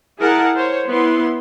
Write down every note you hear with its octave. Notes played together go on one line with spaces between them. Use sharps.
E4 G#4 A#4 F#5 A5
C5 C#5
B3 E4 C6